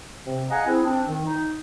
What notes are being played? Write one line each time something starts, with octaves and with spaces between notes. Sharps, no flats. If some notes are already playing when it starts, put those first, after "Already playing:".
C3 C4
G#4 D#5 F5 F#5 G#5 A#5
C4 E4 G#4
C4 D4
D#3
D#4